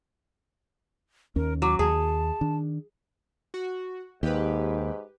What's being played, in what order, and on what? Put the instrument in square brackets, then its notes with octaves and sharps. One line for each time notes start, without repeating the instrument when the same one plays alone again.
[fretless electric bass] D#2 C#4 [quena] A#4
[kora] F#3 [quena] D6
[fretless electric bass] D#2 [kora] G#4 [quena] A5
[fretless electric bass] D#3 D4
[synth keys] F#4
[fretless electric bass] D#2 [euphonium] G#2 [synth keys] G4 B4